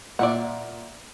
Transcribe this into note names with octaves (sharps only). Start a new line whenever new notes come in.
A#2 D5 E5 F#5